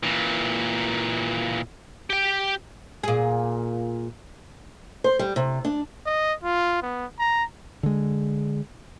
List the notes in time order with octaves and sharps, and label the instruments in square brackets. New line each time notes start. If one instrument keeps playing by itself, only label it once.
[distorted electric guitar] A#2 E3
G4 G5
[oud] A#2 G#4
[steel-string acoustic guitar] C5
G3
C3
D4
[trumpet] D#5
F4
B3
A#5
[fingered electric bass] D3 G#3